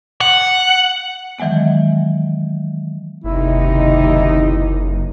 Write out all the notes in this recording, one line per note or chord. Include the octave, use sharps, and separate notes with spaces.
F#5
D#3 E3 F#3 G#3 B3
F#1 D#2 C3 D#4 E4